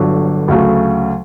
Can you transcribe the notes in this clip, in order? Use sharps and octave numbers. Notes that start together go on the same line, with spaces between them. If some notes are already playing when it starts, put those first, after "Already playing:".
Already playing: G1 G2 D3 F#3
D2 C#3 F#3 A3